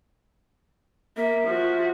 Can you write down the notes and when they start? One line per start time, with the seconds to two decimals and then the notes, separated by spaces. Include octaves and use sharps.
1.17 A#3 E5
1.48 F3 F#4